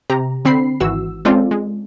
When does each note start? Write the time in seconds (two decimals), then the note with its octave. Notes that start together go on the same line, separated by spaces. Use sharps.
0.10 C3 G4 A#5
0.45 D3 C4 B5 C7
0.80 G#1 E3 F#4 E6
1.25 G#3 C4 C#4 F4 A4 D5
1.51 G#3